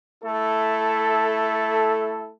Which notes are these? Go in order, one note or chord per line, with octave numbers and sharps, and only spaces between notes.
A3 E4 A4